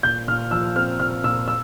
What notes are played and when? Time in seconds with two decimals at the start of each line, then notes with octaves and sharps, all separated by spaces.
0.03 A#2 G6
0.28 A#2 F6
0.51 F3 E6
0.76 C4 F6
0.99 A#2 F6
1.24 A#2 E6
1.48 E6